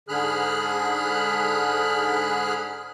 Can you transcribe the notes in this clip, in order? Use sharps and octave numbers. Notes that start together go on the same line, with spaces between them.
G#2 D3 G#4 B5 F6 F#6